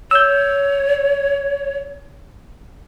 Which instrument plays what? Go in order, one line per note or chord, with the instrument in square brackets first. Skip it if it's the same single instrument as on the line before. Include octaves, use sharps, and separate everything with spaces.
[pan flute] C#5 [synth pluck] E6 G6